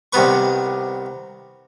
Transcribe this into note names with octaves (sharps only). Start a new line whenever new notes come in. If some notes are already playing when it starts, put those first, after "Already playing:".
C2 C3 D#3 B3 B4 C#6